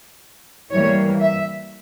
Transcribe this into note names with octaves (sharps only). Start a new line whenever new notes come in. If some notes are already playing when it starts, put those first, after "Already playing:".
E3 G3 A#3 C#5
E5